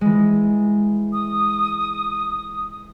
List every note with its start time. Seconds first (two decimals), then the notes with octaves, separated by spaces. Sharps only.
0.01 E3 G#3
1.13 D#6